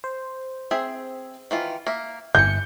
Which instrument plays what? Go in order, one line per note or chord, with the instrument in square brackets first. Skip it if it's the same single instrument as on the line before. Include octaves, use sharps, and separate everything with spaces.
[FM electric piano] C5
[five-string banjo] C4 G#4 E5
D#3 E3 F4
A#3 E5
[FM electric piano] G1 C#7 [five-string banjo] E3 [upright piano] G6